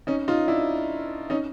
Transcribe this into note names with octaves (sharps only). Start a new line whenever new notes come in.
C#4 D#4
D#4 F4
D4 E4
C#4 D#4